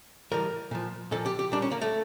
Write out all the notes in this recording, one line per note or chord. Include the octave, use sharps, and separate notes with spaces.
A2 E3 G3 A#4
A#2 F3
A#2 F3 A4
G4
G4
A#2 G3 D4
C#4
A#3
A3